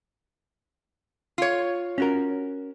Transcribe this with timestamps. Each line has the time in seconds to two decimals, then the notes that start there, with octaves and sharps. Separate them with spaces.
1.38 F4 C#5
1.98 C#4 F#4 A#4